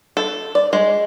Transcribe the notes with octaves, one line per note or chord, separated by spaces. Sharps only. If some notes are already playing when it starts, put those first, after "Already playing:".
A4
D5
G#3